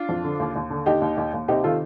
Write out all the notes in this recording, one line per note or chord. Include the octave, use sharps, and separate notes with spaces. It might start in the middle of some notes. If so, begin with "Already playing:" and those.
Already playing: D4 F4
F2
D3
D#2
D#2
D3
D#2 D#4 G4
D#2
D#2
D#2
C3 D#4 G4
D#3 F4 A4